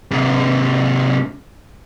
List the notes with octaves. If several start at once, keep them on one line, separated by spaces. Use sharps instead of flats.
G#2 C3